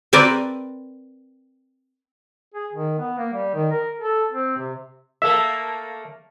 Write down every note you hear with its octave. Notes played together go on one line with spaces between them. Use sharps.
C4 A#4 B4 D5
G#4
D#3
B3
A#3
G3
D#3
A#4
A4
C4
C3
A3 A#3 A4 E5